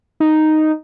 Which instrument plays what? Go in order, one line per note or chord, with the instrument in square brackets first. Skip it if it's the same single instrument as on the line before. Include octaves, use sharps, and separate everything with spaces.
[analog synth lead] D#4